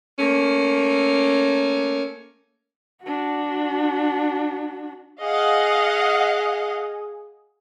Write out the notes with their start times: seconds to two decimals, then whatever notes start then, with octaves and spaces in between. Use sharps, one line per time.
0.19 A3 A#3 C#4
3.04 D4 F#4
5.22 G#4 D#5 F5 F#5